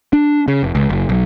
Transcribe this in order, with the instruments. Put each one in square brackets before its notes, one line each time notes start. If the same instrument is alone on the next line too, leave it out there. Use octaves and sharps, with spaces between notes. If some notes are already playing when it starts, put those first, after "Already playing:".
[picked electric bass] D4
C#3
F1
C#2
F#1
B1